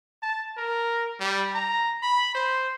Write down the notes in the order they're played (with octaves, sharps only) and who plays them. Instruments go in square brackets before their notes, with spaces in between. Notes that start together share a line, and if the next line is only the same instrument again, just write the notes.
[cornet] A5
A#4
G3
A#5
B5
C5